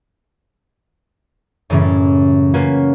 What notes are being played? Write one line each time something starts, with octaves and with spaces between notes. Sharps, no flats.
F#2 A2 C#3 E3 G3 C#4
A#3 C#4 F4 F#4 B4